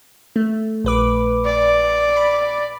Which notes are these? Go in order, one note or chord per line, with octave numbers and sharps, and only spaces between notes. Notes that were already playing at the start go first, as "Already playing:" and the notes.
A3
A#1 B4 D6
D5
B5